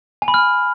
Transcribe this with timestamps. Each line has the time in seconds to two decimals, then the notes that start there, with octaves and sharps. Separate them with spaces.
0.22 G#5
0.28 B5
0.34 F6